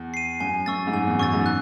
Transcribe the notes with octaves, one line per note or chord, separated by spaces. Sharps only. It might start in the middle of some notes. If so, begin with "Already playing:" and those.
Already playing: E2
C7 D#7
F#2 G#5
F#2 C#6 E6 A6
G#2
F#2 G#5
E2
F#2 C#6 E6 A6
G#2
F#6